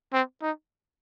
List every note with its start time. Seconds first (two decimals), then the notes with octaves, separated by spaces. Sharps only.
0.13 C4
0.42 D#4